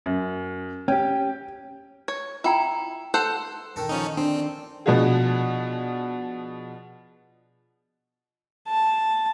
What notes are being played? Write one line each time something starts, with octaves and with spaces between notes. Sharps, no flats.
F#2
C#4 G4 G5
C#5
E4 F4 G5 A#5
A4 C5 F#5
D#3 A4
F3 C#4 D#4
C4 D4
B2 F3 B3 D4 F#4 G#4
A5